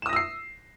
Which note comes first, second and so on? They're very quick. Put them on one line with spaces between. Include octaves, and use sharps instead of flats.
E7 D#6 A#6 E6 C7